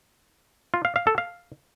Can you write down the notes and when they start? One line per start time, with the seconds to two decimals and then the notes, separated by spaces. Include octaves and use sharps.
0.74 F4
0.85 F5
0.96 F5
1.07 A4
1.18 F5